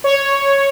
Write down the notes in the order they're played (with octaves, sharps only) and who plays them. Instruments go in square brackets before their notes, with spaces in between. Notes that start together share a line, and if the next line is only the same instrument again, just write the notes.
[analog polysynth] C#5